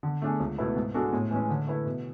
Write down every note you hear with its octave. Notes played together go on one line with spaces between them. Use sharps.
D3
A3 D4 G#4
C#2
B2 A3 E4 B4
G#2
G#3 D4 F#4 A4
A2
E3 G#3 C#4
D3
A3 E4 B4
B2